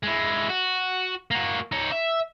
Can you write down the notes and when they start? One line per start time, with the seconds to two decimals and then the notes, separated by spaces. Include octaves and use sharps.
0.04 G#3 E4
0.50 F#4
1.31 A#3 F#4
1.72 D#4 C#5
1.92 E5